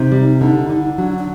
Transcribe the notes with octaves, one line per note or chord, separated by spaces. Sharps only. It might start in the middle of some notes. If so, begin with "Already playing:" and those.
Already playing: C3 D#4
G3
D3
D3
E4
D#4
F#3 D4
D4